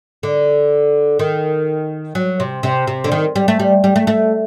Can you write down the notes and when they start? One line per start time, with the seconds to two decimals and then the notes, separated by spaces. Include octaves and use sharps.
0.23 D3
1.19 D#3
2.15 F#3
2.40 C3
2.63 C3
2.87 C3
3.04 D3
3.12 D#3
3.36 G3
3.48 A3
3.60 G3
3.84 G3
3.96 A3
4.07 A3